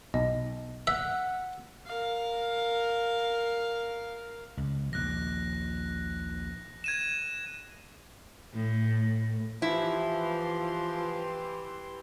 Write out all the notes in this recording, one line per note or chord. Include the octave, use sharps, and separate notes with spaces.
B1 D#5
E5 F#5 B6
A#4 F5
C#2
A#1 D#2 F#6 A#6
G#6 D#7 E7
A2
E3 F3 E4 G4 C6